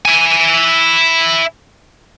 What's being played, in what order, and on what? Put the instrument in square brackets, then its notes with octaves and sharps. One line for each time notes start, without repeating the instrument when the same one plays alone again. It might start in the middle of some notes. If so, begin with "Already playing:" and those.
[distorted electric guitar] E4 G#5